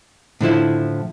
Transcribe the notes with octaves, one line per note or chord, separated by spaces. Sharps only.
A2 D3 F3 E4